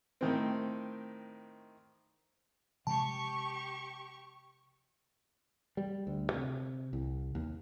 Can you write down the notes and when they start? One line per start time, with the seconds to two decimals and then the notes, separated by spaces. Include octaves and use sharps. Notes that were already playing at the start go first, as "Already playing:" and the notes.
0.21 A2 D#3 C4
2.87 C3 F3 G#3 G4 A5 C#6
5.77 G3
6.07 D2
6.33 C3
6.93 C2
7.35 D#2